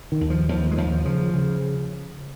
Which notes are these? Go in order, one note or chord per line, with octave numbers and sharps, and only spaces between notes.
D#3
D#2
F3
D#2 F3
G#3
D#2 F3
C#3 F3
C#3